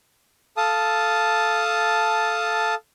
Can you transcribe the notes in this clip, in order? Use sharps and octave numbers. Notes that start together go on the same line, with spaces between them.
A4 F5 A5 D#6